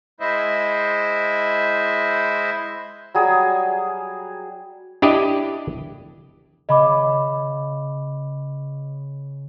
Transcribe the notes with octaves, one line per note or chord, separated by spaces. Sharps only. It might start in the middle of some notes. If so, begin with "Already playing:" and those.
G#3 E4 C5 D#5 E5
F#3 G3 G#4
D4 E4 G4 D5 D#5
C#3 D#5 B5 D6